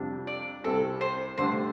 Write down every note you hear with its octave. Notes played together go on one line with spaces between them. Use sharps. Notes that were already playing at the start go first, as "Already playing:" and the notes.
Already playing: F2 C3 G3 D4
D5
C2 C3 G3 C4 A4
C5
G2 D3 A3 D4 G4 C5